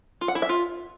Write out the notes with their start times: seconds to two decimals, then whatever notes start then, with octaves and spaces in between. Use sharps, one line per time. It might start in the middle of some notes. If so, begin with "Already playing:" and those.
0.21 F4
0.28 F#5
0.35 E4
0.42 E5
0.49 F4